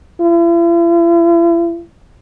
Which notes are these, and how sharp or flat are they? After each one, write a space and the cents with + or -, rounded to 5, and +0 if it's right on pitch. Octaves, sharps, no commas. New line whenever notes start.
E4 +45